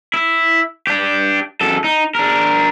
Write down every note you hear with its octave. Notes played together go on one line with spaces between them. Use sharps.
E4
D4 G4
F#2 A4
D#4
D4 A#4